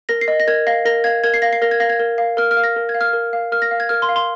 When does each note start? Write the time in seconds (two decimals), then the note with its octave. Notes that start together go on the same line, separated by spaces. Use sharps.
0.09 A#4 A#6
0.21 C7
0.28 D#5
0.40 A#6
0.47 A#4 G#6
0.67 F5 A#6
0.86 A#4 A#6
1.04 F5 G#6
1.24 A#4 G#6
1.34 C7
1.42 F5 A#6
1.53 C7
1.62 A#4 A#6
1.71 G#6
1.80 F5 A#6
1.89 G#6
1.99 A#4
2.18 F5
2.37 A#4 F6
2.51 F6
2.57 F5
2.64 A#6
2.76 A#4
2.89 G#6
2.94 F5
3.01 F6
3.13 A#4
3.33 F5
3.52 A#4 F6
3.62 A#6
3.71 F5
3.80 G#6
3.89 A#4 F6
4.02 C6
4.09 F5
4.16 C6